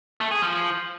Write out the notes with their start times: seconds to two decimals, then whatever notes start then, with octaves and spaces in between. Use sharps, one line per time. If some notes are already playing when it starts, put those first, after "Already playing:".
0.21 A3
0.31 G#4
0.42 F3